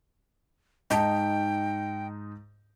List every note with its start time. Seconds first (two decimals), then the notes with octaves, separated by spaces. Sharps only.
0.90 G#2 D#4 D#5 G5 A5